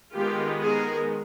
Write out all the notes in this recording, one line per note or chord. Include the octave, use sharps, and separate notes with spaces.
D#3 G#3 B3 F4 G4
G#4 A#4